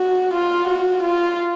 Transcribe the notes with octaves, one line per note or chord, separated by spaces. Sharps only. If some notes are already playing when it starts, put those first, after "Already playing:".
Already playing: F#4
F4
F#4
F4